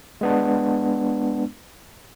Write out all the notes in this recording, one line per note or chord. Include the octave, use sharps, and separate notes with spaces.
G#3 B3 D4